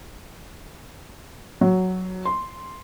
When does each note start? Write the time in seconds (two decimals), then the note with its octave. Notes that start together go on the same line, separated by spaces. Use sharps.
1.61 F#3
2.25 C6